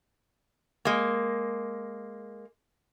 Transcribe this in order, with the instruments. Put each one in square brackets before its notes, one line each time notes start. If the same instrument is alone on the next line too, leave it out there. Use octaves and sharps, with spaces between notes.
[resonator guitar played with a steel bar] G#3 A#3